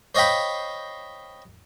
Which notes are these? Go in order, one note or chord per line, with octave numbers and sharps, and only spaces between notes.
C5 C#5 D#5 F5 G5 B5